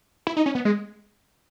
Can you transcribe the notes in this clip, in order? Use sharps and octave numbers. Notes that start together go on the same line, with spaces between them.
E4
D#4
C#4
B3
G#3